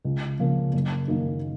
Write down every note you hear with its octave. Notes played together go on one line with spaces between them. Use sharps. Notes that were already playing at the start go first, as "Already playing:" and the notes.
C#2
C#3 F3 A#3
F#1
F#2 D#3 A#3